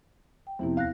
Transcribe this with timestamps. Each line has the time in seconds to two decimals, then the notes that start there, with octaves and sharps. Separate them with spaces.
0.47 G5
0.59 F2 C3 B3 E4 E5
0.77 D#2 F5 F#6 A#6